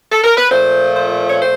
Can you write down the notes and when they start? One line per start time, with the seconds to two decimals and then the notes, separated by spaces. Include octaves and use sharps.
0.12 A4
0.24 A#4
0.37 B4
0.50 A#2 F3 A3 C5
0.96 C5
1.28 C#5
1.41 C5